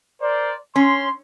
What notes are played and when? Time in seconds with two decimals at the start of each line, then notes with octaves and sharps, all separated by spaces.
0.21 A#4 C5 D5
0.76 C#4 C6